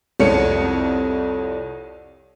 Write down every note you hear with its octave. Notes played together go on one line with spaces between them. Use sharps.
C2 F2 C4 C#5 C#7